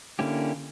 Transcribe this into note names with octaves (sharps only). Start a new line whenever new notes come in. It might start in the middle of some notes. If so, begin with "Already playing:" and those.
D3 A#3 C#4 E4 G4